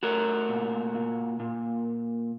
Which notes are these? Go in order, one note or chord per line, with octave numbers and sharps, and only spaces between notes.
A3 F#4 A#4
A#2
A#2
A#2